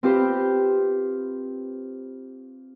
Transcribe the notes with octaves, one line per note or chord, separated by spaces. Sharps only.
C4 F4 G4 B4 C5